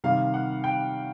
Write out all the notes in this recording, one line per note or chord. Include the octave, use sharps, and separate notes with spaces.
C3 D#3 G3 F5
F#5
G5